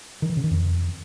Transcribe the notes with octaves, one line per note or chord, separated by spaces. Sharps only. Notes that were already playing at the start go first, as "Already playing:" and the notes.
D#3
E3
C#3
D#3
F2